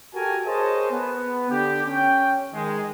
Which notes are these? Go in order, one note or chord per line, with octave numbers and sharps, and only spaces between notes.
F#4 G4 A4 A#4 G#5
G#4 A#4 C5 C#5 D#5 A5
B3
D3 G4
C#4 G5
D#3 G#3